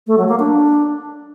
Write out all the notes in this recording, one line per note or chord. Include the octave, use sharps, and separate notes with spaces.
A3
F#3
A#3
D4